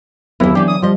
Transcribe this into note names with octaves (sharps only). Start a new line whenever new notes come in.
D#2 D3 F#3 B3 E4 A#4
E3 D4 G4
D#6
F3 G3 D#5